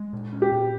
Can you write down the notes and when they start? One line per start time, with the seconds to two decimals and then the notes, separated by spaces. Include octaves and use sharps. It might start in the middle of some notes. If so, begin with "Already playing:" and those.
Already playing: G#3
0.13 A#2
0.33 C#4
0.42 G4
0.52 A#2